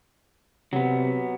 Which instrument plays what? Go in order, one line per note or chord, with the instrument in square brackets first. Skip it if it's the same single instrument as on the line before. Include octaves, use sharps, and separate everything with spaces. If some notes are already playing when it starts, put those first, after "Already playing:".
[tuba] C3 [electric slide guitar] F#3 B3